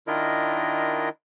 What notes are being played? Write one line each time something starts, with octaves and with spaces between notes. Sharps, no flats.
D#3 D4 E4 F4 A#4 D#5